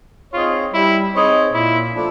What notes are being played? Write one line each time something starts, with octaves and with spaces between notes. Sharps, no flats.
C4 D#4 F4 G#4 C#5
G3 E4
C4 D#4 G#4 C#5
A#2 E4
F3 A3 D4